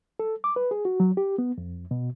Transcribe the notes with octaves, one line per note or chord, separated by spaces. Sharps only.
A4
D6
B4
G#4
F#4
F#3
G4
B3
F2
B2